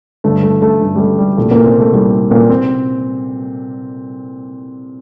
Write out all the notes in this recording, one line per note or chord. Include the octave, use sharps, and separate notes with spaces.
G1 G2 D3 A3
A3
A3
G1 G2 D3
G3
A3
G3
C2 A#2 A3
A#2 A#3
C3 C4
A3
C2 A#2 G3
A#2 A#3
C3 C4